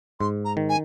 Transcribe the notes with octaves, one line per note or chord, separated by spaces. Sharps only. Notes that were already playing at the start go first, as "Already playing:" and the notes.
G#2 C6
A#5
D#3
G#5